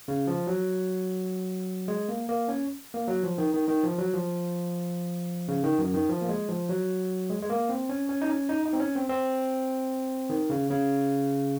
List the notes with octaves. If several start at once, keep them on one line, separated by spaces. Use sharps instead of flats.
C#3
F3
F#3
G#3
A#3
A#3
C#4
A#3
F#3
F3
D#3
D#3
D#3
F3
F#3
F3
C#3
D#3
F#2
D#3
F3
A#3
G#3
F3
F#3
G#3
G#3
A#3
C4
C#4
C#4
D#4
C#4
D#4
D#4
C4
C#4
C4
C4
D#3
C#3
C#3